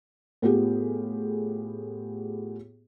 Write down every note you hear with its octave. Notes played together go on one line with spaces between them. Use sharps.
A2 B3 F4 G4 G#4